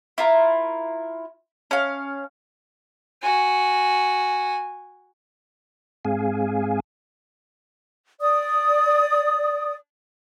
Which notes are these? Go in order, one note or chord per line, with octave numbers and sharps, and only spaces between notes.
E4 F4 A#4
C#4 F5
F#4 G#5
G#2 G#3 C4 G#4 F5 G#5
D5 D#6